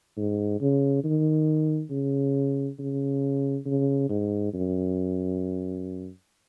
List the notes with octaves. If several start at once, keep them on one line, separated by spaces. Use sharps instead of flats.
G#2
C#3
D#3
C#3
C#3
C#3
G#2
F#2